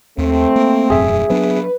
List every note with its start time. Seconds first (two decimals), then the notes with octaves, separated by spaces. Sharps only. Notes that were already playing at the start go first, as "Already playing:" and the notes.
0.18 D#2 A3 C4
0.56 A#3
0.90 E1 F#2 A2 G#4 E5
1.30 F#3 B3 D4 B4